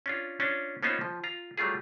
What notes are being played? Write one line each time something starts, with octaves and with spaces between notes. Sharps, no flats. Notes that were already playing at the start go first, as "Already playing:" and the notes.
C#4 D4 F4
C#4 D4 F4
A#3 B3 C#4 D#4 F4 C5
F3
F4 A#5
F#3 G3 A3 F4 G#4